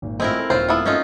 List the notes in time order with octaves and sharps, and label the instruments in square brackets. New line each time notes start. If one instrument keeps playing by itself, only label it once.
[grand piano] G#1 A#2
[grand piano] A2 C#4 F4 [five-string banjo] G#3 [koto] C4 E4 A#4
[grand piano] A4
[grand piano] D#1 A4 C#5 [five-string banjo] C4 C5 [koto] F4
[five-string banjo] A3 B3 E4
[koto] C#4 D#4 F4 [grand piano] A4 D#5